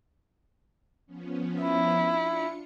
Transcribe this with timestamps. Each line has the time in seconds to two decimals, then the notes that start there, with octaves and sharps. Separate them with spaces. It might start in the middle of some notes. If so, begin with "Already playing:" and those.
1.06 F3 B3 C#4
1.61 E4
2.06 D4 F4 C#7